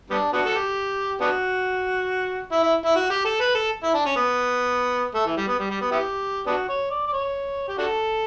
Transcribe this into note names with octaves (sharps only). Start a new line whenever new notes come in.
G3 B3 D4
B3 D4 F#4
A4
G4
B3 D4 F#4
E4
E4
E4
F#4
G4
A4
B4
A4
E4
D4
C#4
B3
A3
E3
G3
B3
G3
G3
B3
B3 E4 G4
B3 D4 F#4
C#5
D5
D5
C#5
G4
D4 F#4 A4